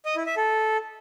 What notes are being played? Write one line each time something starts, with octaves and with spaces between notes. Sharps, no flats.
D#5
E4
E5
A4